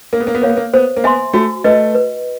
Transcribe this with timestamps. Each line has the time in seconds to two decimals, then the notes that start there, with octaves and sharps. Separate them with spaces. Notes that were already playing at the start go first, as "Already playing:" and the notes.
0.13 A#3 A#4
0.20 B3
0.27 A#3
0.35 B3
0.42 A#3 C#5 F5
0.49 B3
0.57 A#3
0.74 B3 C5
0.97 A#3
1.04 B3 E5 G#5 C6
1.33 A3 F#4
1.64 A3 B4 D#5
1.95 B4